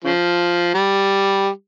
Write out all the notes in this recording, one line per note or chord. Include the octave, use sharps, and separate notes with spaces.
C#3 F3
G3